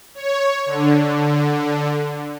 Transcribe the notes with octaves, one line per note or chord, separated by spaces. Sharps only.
C#5
D3